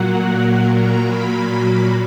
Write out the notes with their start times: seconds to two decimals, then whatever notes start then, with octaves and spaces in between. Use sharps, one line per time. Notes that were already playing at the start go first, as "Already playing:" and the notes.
Already playing: A#2 F#3 A#3 F#5
0.75 A#5
1.06 B5